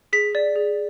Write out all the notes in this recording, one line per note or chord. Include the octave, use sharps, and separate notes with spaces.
G#4 B6
D5
G#4